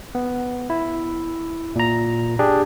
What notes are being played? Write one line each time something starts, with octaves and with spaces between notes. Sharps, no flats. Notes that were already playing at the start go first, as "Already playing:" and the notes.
B3
E4
A#2 A#5
D4 G4 G#4